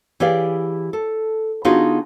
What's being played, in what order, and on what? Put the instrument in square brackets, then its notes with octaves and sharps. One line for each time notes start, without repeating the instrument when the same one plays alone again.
[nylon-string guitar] E3 E4 G4 G#4 D5 F5
A4
D3 B3 D#4 F4 F#4 G#4